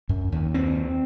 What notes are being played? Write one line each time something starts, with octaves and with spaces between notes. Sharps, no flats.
F#2
D#2
C4